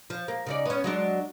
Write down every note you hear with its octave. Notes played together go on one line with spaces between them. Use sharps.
F3
A#3
C#3 D#4 D5
B3 C#4
F#3 G#3 D4